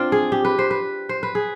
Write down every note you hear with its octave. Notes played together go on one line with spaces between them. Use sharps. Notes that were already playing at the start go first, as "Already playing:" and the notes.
Already playing: C4 D4 F4
G#4
G4
B4
C5
B4
C5
B4
G#4